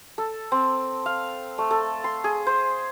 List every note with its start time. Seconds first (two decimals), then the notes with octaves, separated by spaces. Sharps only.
0.18 A4
0.52 C4
1.06 F5
1.58 A3
1.71 A4
2.04 C6
2.24 G#4
2.47 C5